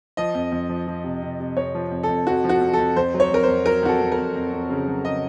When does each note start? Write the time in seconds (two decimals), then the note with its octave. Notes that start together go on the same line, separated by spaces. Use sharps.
0.17 F3 D#5
0.35 F2
0.52 F2
0.69 F3
0.87 F3
1.04 C3
1.22 C3
1.40 C3
1.57 F2 C#5
1.74 F3
1.91 F2
2.03 A4
2.09 F2
2.27 F2 F#4
2.44 F3
2.49 F#4
2.61 F2
2.73 A4
2.79 F2
2.96 F2 C5
3.14 F#3
3.20 C#5
3.30 F2 A#4
3.43 F2 C5
3.66 F#3 A#4
3.83 F2 F#4
3.88 A4
4.01 F2
4.12 A#4
4.18 F2
4.36 F2
4.53 F2
4.70 C#3
4.87 F#3
5.05 C#3 D#5